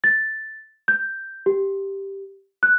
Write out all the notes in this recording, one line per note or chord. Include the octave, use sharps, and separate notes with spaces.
A6
G6
G4
F#6